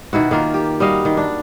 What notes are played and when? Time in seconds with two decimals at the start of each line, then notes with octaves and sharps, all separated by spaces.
0.13 B2 D#3 E4 F#4
0.31 D#3 A#3 F4
0.54 G4
0.80 G3 F#4 D#5 F5
1.05 D#3
1.17 D4